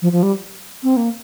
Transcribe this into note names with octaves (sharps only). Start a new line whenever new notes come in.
F3
F3
G3
C4
A#3